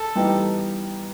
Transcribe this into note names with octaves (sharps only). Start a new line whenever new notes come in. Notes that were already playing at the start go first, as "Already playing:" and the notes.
Already playing: A4
E3 G3 B3 D#4 G4